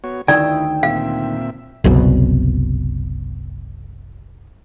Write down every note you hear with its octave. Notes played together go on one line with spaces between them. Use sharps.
B3 F#4 C#5
D2 D#3 D#4 E4 D5 G5 D#6 E6
A#2 C4 E5 F5
F#1 C2 F#2 B2